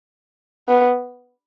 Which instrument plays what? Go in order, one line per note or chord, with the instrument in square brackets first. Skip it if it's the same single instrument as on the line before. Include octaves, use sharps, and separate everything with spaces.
[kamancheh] B3